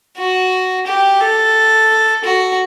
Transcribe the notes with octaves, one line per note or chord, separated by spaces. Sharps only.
F#4
G4
A4
F#4